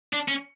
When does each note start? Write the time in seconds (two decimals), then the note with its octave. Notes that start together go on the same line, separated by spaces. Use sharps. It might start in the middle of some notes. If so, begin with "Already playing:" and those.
0.13 D4
0.28 C#4